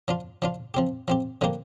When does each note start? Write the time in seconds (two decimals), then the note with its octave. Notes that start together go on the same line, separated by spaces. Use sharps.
0.08 F3 D4 F4
0.42 F3 D4 F4
0.74 F3 C4 G4
1.08 F3 C4 G4
1.41 D3 F3 A#3 G4